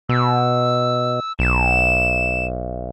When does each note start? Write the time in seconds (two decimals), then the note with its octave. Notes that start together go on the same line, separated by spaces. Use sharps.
0.09 B2 E6
1.39 B1 E7